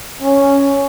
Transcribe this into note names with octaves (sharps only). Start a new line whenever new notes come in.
C#4